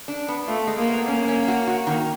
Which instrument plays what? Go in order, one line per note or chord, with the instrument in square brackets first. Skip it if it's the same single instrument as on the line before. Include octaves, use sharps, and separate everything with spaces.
[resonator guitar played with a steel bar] D4
B3
[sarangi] A3 [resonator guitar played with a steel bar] F4
[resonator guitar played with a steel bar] G#3
[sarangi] A#3
[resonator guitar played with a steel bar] B3
[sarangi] A#3 [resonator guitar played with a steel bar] C#4
[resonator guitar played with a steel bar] C#4
F#4
F#4
D#3